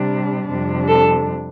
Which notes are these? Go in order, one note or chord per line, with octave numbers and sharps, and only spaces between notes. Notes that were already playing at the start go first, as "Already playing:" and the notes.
Already playing: C3 G3 D4
F2 C3 G3 D4
A4